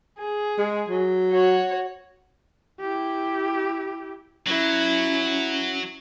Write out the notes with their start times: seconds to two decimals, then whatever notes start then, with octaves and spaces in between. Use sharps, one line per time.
0.18 G#4
0.58 G#3
0.88 F#3
1.32 F#4 C#5
2.80 E4 G4
4.47 F#3 C#4 E4